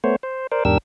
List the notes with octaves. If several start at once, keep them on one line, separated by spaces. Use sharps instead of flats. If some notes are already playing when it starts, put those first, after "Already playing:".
A3 B3 C5 C#5
C5
A#4 C5 D5
E2 G#2 D4 G4 A#4 E6